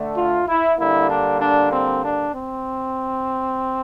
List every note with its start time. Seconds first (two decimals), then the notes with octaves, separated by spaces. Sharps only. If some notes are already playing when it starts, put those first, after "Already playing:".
Already playing: D3 A3
0.16 F4
0.48 E4
0.79 D3 G3 A#3 E4
1.10 D4
1.41 D4
1.73 C4
2.04 D4
2.35 C4